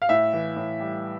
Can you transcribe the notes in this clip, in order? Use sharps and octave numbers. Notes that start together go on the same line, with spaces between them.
F5
A2 E5
E3
A2
G3